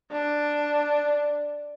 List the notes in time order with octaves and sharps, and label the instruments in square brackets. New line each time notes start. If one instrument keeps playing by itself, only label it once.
[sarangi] D4